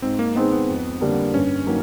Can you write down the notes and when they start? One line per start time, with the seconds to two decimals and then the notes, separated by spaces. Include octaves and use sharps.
0.02 G#2 C4
0.19 A#3
0.35 D#3 G#3 B3 C4 D#4
0.52 B3
0.68 F2
1.01 D3 G3 A#3
1.34 G2 C#4
1.67 D#3 F#3 A#3